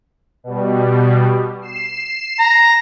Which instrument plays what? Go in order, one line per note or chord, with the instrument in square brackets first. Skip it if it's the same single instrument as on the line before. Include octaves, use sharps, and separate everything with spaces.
[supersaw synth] B2 G3
C7 E7
[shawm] A#5